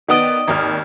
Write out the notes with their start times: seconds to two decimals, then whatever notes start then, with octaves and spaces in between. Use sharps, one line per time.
0.08 D#3 B3 D5 D#5
0.48 G#1 D#2 F6